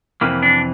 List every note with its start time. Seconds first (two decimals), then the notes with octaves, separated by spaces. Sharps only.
0.21 F2 C3 E3 A#3
0.42 D4